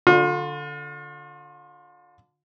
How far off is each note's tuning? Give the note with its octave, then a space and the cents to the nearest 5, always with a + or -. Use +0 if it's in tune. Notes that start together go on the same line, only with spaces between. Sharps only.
D3 +0 F4 +40